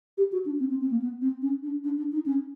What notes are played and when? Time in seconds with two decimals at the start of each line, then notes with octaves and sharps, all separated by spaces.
0.17 G4
0.32 F#4
0.45 D4
0.60 C4
0.70 C4
0.81 C4
0.91 A#3
1.02 B3
1.21 C4
1.42 C#4
1.63 D4
1.84 D4
1.97 D4
2.12 D#4
2.26 C#4